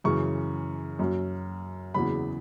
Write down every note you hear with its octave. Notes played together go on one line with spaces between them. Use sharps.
F#2 C#3 E3 C#6
F#2 F#3
E2 C#3 F#3 B5